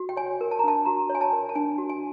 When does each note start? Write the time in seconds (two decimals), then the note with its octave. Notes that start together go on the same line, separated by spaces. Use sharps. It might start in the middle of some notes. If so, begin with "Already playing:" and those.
Already playing: F#4
0.09 G5
0.17 C#5 G#5
0.41 A#4
0.51 A5
0.59 A#5
0.64 D4 A5
0.85 F#4 A#5
1.09 C#5
1.15 G#5
1.21 A5
1.33 A#4
1.49 A5
1.55 D4 G#5
1.78 F#4
1.90 G#5